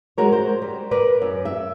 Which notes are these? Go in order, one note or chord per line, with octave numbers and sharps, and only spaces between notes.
G#3 F#4 A#4 C#5
C5
G3
A#4 B4 D5
F#2
E5